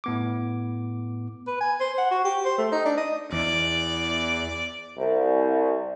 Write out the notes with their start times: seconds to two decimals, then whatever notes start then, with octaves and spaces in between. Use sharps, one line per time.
0.04 A2 B3 D6
1.47 B4
1.61 G#5
1.80 C5
1.98 F#5
2.11 F#4
2.24 G4
2.45 C5
2.58 A3
2.72 D#4
2.85 D4
2.97 D#5
3.32 E2 D5
4.97 C2